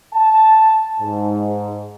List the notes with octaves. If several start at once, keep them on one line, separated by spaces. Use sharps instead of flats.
A5
G#2